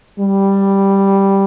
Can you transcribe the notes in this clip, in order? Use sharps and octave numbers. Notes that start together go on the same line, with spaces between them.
G3